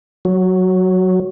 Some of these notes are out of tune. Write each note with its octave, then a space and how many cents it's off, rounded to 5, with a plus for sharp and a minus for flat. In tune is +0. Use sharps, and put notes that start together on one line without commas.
F#3 +0 F#4 +0 C#5 +0